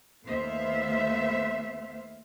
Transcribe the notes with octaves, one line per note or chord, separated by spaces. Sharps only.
D#2 A3 B3 C5 E5 F5